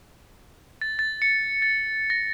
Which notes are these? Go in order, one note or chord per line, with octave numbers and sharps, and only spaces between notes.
A6
A6
C#7
A6
A#6